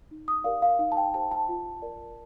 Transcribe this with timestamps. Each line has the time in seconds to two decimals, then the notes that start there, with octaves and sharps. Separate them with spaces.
0.11 D#4
0.28 D#6
0.44 G4 A#4 D5 F5
0.62 F5
0.79 D#4 F5
0.92 A5
0.97 G5
1.14 G4 C5 A5
1.31 A5
1.48 F4
1.82 A#4 D5